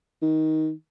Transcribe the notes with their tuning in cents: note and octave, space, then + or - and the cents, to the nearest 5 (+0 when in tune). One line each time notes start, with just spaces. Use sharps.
D#3 +15